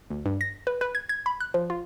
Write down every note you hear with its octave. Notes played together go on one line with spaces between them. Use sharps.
D2
G2
A#6
B4
B4
G#6
G#6
B5
F#6
F3
F4